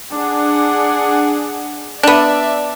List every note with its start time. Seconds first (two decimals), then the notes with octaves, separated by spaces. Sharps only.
0.13 D4 G#4 F#5
2.03 B3 D4 D5 E5